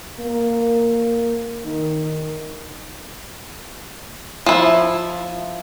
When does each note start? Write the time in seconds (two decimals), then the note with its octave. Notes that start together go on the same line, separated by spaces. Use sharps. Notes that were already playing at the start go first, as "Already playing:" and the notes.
0.19 A#3
1.65 D#3
4.46 F3 E4